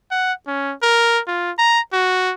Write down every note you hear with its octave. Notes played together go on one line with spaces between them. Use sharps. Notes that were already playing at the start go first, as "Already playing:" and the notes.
F#5
C#4
A#4
F4
A#5
F#4